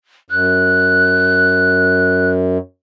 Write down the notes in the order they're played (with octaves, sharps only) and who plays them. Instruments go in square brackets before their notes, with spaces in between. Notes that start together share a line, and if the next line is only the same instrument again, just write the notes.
[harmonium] F#2 [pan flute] F#6